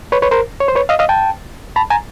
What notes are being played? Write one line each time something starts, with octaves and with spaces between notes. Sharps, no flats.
B4 C#5
B4 C#5
A#4 C5
C#5
C5
B4 C#5
D#5 F5
D#5 F5
G5 A5
A5 B5
G#5 A#5